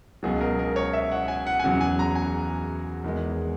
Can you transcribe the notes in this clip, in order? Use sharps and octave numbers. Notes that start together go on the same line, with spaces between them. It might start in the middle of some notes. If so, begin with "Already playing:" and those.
C#2 B2 F#3 G#4
A#4
A#4
C#5
E5
F#5
G#5
F#5
G#5
E2 C#3 F#3 F#5
G#5
A#5
G#5
E2 D#3 G#3